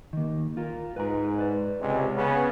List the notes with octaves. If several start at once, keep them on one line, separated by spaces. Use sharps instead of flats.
D#3 A#3
F4 A#4
G#2 B4 A#5
B4 D5
C#2 C3
C#3 B3